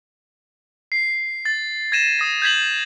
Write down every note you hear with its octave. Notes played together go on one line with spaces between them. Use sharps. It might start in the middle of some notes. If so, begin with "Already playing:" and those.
C7
A6
G#6 A#6 D#7 E7
D#6 A#6
G6 G#6 B6 F#7